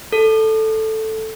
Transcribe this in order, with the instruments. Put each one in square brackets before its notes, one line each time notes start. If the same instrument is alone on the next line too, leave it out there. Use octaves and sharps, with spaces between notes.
[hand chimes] A4